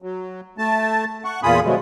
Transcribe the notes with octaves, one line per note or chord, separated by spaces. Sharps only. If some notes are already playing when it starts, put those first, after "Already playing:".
F#3
A3 A5
F#5 C#6
E2 A#2 F4 G#4 B5 D#6
B2 D3 F3 F#3 G#3 A3